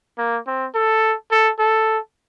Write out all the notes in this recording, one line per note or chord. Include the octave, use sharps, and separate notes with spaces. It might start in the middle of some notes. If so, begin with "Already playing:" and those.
A#3
C4
A4
A4
A4